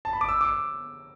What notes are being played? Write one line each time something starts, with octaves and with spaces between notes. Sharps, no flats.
A5
B5
D6
E6
D6